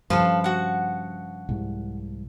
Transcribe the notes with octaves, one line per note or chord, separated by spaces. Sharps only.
G2 C#3 F3 A4 B4 F5
F#4 F#5
C2 G#2